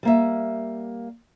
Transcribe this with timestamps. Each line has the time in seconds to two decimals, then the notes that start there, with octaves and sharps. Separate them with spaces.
0.03 G3 A#3 E5